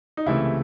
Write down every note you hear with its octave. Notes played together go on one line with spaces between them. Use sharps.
D#4
C#2 C3 E3 A3 E4